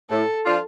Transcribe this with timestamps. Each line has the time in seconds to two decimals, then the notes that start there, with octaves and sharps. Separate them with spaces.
0.10 A2 A4
0.44 F3 D4 F4